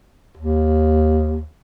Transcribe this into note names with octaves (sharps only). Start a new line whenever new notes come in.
D#2